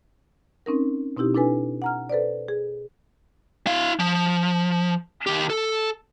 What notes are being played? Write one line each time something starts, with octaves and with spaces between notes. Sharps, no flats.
C4 C#4 D#4 A#4
B2 C4 D#4 E4 G4
D4 E4 A4 B4 G#5
F#5 A#5 F6
A4 B4 C5 D5
G#4
E4 F5
F3
D#3 G4
A4